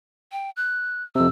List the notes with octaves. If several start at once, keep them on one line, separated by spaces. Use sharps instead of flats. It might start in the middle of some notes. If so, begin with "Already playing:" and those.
G5
F#6
F2 C3 E6